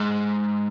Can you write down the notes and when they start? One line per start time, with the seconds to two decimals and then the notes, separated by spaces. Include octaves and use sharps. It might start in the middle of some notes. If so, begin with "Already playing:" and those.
Already playing: G#2